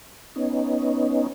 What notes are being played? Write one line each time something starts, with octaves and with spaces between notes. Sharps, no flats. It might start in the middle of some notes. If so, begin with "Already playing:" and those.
B3 C#4 D#4